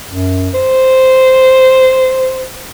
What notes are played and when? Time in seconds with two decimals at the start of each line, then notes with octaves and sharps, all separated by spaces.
0.09 F#2
0.54 C5